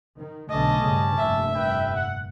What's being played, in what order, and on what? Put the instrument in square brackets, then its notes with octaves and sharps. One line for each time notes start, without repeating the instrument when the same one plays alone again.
[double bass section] D#3
[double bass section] B1 D3 A3 [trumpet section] C#4 D5 A5 [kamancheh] D#5
[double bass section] G2 C#3
[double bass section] F1 G2 A#2 [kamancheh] E5
[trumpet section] B4 G5
F#5